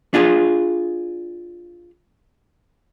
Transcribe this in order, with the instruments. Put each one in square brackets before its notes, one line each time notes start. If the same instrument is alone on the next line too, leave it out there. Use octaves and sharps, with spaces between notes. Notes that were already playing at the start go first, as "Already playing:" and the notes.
[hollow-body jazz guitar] D4 F4 G#4